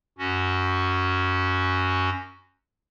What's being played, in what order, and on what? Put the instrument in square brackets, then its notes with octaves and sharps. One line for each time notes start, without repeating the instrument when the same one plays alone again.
[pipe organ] F#2 C#4 F#4